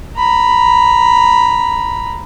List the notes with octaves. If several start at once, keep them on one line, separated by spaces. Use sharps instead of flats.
A#5 B5